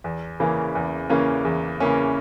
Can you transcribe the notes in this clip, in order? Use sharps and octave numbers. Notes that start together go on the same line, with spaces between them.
E2
C#3 E3 A#3 C#4
E2
C#3 E3 A#3 C#4
E2
C#3 E3 A#3 C#4